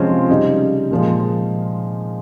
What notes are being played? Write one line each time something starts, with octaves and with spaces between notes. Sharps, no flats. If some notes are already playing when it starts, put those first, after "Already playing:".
Already playing: C3 F3 G#3 C4 C#4
F4
C#3 G3 D#4
A#2 F3 G#3